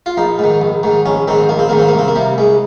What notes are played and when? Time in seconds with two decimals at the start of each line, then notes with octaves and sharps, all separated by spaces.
0.06 F4
0.17 A#1 D#4
0.39 G#2 D#3
0.61 A#1
0.83 G#2 D#3
1.06 A#1 C#4
1.28 G#2 D#3 C4
1.49 A#1 A#3
1.59 C4
1.69 G#2 D#3 A#3
1.79 C4
1.88 A#3
1.93 C2
1.98 C4
2.08 A#3
2.16 C3 G3
2.38 C2 G#3